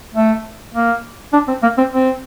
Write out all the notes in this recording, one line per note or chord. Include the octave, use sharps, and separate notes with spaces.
A3
A#3
D4
C4
A#3
C4
C4